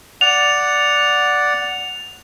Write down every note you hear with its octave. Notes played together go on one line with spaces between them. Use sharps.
D5 F#5 F7